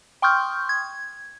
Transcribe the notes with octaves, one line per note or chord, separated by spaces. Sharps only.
G5 C6 C#6 D#6 F6 G6
G#6